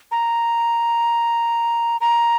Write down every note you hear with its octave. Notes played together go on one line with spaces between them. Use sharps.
A#5
A#5